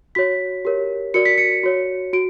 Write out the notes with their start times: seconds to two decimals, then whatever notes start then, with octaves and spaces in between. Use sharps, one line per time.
0.15 F#4 C#5 B6
0.65 G4 A#4 C#5
1.14 F#4 A#4 D5 C#7
1.25 B6
1.38 C#7
1.63 F#4 C#5
2.13 F#4 D7